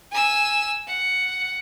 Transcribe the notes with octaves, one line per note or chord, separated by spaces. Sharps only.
G#5 E6
F#5